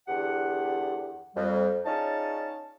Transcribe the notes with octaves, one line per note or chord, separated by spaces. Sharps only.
E2 D3 G4 F#5
F2 G3
C#4 D#4 F4 G#4 D5 A5